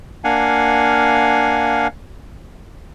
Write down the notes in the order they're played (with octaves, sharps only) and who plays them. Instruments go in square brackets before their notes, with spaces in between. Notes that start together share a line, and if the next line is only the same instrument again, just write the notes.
[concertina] A#3 D4 F5 F#5 G#5